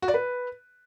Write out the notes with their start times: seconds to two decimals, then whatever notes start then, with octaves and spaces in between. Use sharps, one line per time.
0.02 F#4
0.08 D5
0.14 B4